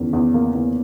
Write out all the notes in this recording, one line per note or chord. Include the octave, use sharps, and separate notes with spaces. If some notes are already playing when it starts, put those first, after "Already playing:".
Already playing: E2 D#3 C#4
E2
A#3
E2